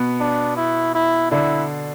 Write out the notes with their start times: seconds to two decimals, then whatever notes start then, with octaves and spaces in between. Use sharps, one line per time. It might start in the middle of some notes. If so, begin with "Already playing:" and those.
Already playing: B2 B3
0.20 D4
0.57 E4
0.94 E4
1.31 D3 D4 E4